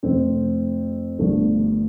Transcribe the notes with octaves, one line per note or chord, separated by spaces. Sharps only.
F2 C3 F3 A3 C4
G1 G2 F3 A3